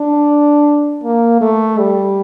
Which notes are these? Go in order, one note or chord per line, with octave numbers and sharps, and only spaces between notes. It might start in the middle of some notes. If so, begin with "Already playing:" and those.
Already playing: D4
A#3
A3
G3